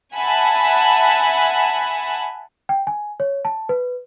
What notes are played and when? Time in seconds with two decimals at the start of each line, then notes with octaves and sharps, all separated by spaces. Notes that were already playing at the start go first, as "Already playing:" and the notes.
0.15 E5 F#5 G#5 A5 B5
2.69 G5
2.87 G#5
3.20 C#5
3.45 A5
3.69 B4